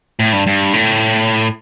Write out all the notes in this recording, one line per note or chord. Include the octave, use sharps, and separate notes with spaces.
A2
G2
G2
A2